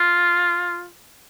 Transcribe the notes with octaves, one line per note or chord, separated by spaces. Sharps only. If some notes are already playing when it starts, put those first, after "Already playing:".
Already playing: F4